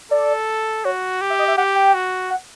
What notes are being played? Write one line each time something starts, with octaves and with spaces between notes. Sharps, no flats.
A4 D5
F#4 C#5
G4
E5
D#5
E5
G4 F#5
G5
F#4
F#5